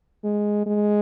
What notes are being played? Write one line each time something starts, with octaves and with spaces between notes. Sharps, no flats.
G#3
G#3